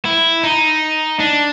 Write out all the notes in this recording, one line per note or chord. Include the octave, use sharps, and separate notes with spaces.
E4
D#4
D4